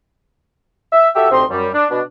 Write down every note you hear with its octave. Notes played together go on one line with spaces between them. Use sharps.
E5
F#4 G4 A4 E5
D2 C3 C4 D#4 C6
F#2 G3
D4
B2 D4